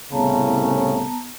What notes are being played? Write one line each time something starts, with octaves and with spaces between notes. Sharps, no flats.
C2 A2 C#3 B3 A5 A#5